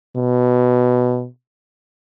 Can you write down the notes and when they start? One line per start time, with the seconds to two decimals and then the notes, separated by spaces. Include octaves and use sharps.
0.16 B2